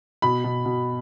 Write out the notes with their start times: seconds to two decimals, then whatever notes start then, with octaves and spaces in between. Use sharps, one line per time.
0.22 B2 B5
0.44 B2
0.65 B2